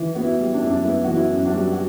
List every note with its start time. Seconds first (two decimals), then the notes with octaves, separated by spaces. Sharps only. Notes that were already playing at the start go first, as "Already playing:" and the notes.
Already playing: E3
0.15 B3 F#4
0.23 E4
0.39 G3
0.54 D4
0.62 F#2 E4
0.70 D4
0.85 B3 E4
1.04 E3 F#4
1.15 E4
1.30 F#2
1.45 D4 F#4
1.54 G3
1.72 F#4